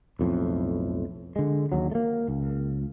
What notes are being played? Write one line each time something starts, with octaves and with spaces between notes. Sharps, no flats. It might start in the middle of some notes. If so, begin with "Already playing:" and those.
B1 F2 A2
D3 G#3
D#2 F#3
A3 A#3
C#2